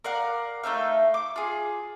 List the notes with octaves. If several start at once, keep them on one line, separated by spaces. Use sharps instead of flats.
A#4 D5 F5 F#5
A3 D#4 E5 F5
D6
F4 G#4